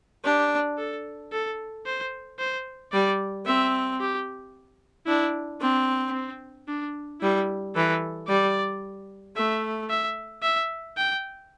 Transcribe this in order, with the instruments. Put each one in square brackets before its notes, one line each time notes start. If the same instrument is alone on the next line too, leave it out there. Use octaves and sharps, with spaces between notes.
[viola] D4 [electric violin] G4
[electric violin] A4
A4
C5
C5
[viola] G3 [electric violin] D5
[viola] C4 [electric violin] E5
[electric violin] G4
[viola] D4 [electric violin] E4
[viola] C4 [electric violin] D4
[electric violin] C4
D4
[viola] G3 [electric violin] E4
[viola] E3 [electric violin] A4
[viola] G3 [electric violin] D5
[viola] A3 [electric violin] E5
[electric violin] E5
E5
G5